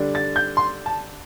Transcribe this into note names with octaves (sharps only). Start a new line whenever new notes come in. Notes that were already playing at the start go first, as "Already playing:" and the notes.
Already playing: D3 G3 D4
A6
G6
C6
A5